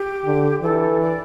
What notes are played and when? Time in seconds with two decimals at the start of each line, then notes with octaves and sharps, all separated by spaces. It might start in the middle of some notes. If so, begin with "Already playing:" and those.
Already playing: G4
0.25 D3
0.62 E3 A4
1.01 D5